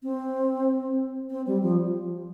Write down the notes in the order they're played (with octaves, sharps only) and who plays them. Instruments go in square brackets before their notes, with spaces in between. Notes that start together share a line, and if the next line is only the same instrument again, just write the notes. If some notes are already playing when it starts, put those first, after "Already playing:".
[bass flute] C4
C4
G3
F3